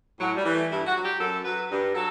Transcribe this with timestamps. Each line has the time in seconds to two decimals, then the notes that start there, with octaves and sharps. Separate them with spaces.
0.20 A2 F#3
0.36 G3
0.45 E3
0.53 A3
0.70 G2 E4
0.87 F#4
0.95 F#3
1.03 G4
1.20 F#2 A4
1.44 F#3 B4
1.71 G2
1.95 F#3 A4